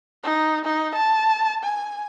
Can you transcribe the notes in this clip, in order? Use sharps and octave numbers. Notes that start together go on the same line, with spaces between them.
D#4
D#4
A5
G#5